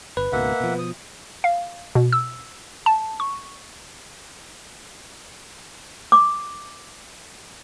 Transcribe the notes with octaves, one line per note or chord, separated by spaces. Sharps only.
G1 B4
C#2 G#2 B2 A#3 E5 F#5
B2 F3
D#6
F5
B2
E6
A5
C#6
D6